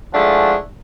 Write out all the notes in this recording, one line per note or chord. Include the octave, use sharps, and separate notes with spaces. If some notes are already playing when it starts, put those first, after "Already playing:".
F3 G#3 A3 D4 E4 F#5